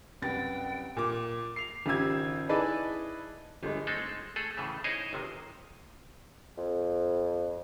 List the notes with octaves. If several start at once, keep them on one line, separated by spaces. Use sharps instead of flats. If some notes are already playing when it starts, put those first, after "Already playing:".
C2 F#2 B4 F#5 G5 A6
A#2 D6
C7 F7
G#1 C#3 F4 G4 E6 G#6
D#4 E4 G#4 B4 D5 A5
G1 G#3
G#3 A3 C4 D#4 A4
A3 G#4 A4
A2 C#3 E3 A3
D#4 E4 G#4 C5 C#5 D#5
G1 C3 D#3
F2